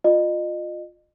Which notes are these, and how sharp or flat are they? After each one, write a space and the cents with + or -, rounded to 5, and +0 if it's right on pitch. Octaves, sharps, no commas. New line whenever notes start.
F4 +15 D#5 -30